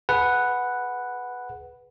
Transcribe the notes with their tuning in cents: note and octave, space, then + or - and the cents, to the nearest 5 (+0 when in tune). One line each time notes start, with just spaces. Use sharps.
G#4 +25 B4 +0 F#5 +0